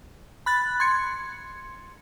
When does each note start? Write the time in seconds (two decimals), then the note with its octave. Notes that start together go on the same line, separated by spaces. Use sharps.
0.46 B5 F#6 A6
0.80 C6 G#6 C#7